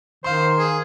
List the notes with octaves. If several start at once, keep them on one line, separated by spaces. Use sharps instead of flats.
D#3 C5 F5 C6
G#4